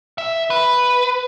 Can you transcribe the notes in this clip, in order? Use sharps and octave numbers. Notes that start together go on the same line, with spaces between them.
E5
B4